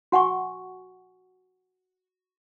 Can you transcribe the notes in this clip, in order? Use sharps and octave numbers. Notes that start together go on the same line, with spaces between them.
F#4 F#5 G#5 C#6